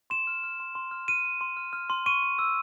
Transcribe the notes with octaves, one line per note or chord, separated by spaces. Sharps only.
C6 E7
F6
F6
C6
C6
F6
F6 D#7
C6
C6
F6
F6
C6
C#6 D#7
C#6
E6